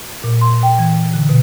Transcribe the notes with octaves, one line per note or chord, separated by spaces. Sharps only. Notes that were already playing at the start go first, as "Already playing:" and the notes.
A#2
C6
G5
E3
D3
B2